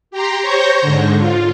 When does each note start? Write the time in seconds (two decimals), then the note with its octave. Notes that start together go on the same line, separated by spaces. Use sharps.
0.11 G4 A#5 C6
0.41 C5 C#5 C#6 G6 A#6
0.82 G#2 D3
1.18 F4